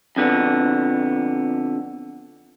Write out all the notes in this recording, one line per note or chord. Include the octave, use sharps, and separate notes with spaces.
F2 D3 B3